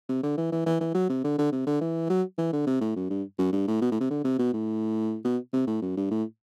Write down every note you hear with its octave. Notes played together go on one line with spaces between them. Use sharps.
C3
D3
E3
E3
E3
E3
F#3
C3
D3
D3
C3
D3
E3
F#3
E3
D3
C3
A2
F#2
G2
F#2
G2
A2
B2
A2
C3
D3
C3
B2
A2
B2
C3
A2
F#2
G2
A2